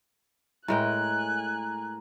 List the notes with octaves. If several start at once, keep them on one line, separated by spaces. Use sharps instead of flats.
A2 G#3 A#4 G5 G#5 F#6